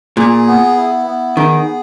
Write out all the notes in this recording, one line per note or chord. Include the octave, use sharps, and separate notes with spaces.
A#2 G#4
B3
E4
B3
D#3 G#4
B3